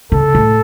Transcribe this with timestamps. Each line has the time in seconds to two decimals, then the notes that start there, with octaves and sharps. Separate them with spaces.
0.12 C#3 A4
0.35 A2